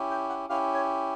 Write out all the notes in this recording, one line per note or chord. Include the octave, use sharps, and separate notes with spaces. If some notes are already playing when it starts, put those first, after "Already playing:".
Already playing: C#4 E4 G4
G5
F#5
C#4 E4 G4 F5
C#5